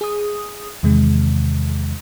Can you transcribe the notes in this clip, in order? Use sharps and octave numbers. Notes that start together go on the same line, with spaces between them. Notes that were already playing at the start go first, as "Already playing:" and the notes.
G#4 D#6
E2 C3 D#3 G#3